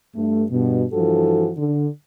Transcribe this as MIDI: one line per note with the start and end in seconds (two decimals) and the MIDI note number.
0.15 0.43 43
0.15 0.43 57
0.50 0.84 43
0.50 0.84 47
0.93 1.51 43
0.93 1.51 52
0.93 1.51 53
0.93 1.51 66
0.93 1.51 69
1.57 1.87 50